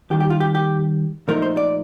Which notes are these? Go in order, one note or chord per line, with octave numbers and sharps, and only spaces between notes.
D#2 D#3 G3 G4
G4
F4
G4
G4
A#2 F3 A3 D#4 A#4
C5
D5